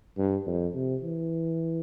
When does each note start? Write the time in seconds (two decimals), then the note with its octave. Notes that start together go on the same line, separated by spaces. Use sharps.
0.18 G2
0.47 F2
0.75 C3
1.03 E3